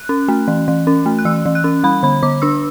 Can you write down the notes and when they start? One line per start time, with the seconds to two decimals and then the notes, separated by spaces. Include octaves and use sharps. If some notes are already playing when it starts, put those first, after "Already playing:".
Already playing: F#6
0.09 C#4
0.28 A3
0.48 E3
0.68 E3
0.87 C#4
1.06 A3
1.19 F#6
1.25 E3 E6
1.45 E3
1.55 F#6
1.64 C#4
1.84 G3 B5
2.03 D3 B5
2.23 D3 D6
2.42 D4 E6